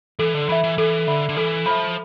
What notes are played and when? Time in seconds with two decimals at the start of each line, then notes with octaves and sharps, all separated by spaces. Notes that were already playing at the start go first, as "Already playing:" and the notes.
0.19 E3 A4
0.34 D3
0.49 E3 E5 B5
0.64 E3
0.78 E3 A4
1.07 D3 E5 B5
1.29 D3
1.36 E3 A4
1.66 F3 E5 B5